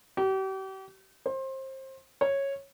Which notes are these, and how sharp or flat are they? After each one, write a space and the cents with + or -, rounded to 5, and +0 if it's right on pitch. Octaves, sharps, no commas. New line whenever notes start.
G4 -40
C5 +25
C#5 -10